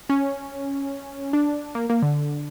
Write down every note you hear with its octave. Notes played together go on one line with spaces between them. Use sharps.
C#4
D4
A#3
A#3
D3